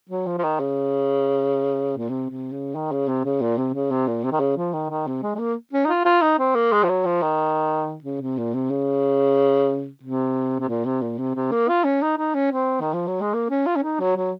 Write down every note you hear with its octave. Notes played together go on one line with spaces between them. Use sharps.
F#3
F3
F3
D#3
C#3
A#2
C3
C3
C#3
D#3
C#3
C3
C#3
A#2
C3
C#3
C3
A#2
C3
D#3
C#3
F3
D#3
D#3
C3
G#3
G#3
A#3
C#4
D#4
F4
F4
D#4
C4
A#3
G#3
F3
F#3
F3
D#3
C#3
C3
A#2
C3
C#3
C3
C3
A#2
C3
A#2
C3
C3
A#3
F4
C#4
D#4
D#4
C#4
C4
D#3
F3
F#3
G#3
A#3
C#4
F4
C#4
D#4
F#3
F#3